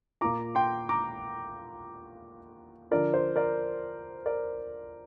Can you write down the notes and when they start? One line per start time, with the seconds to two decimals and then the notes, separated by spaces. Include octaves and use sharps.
0.21 A#2 A#3 F4 A#5 D6
0.55 G5 C6
0.89 A#5 D6
2.91 D3 F3 D4 F4 A#4 D5
3.14 C5
3.36 A#4 D5
4.26 A#4 D5